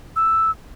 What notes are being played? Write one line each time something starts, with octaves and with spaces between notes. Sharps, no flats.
E6